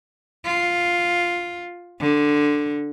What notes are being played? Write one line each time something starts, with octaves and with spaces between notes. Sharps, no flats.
F4
D3